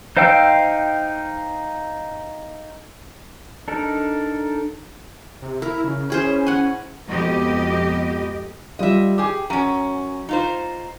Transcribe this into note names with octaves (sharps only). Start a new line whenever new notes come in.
D#4 C5 F5 G5 E6
D4 D#4 A4 A#4
C3
E4 A#4
C#3
C#4 E4 G#4 C5
F#5 G#5
F2 G#2 B2 G4 D#5
G3 F4 D#5 E5
G4 G#4 G5 D6
F#2 C#4 A#5 D#7
D#4 F4 C5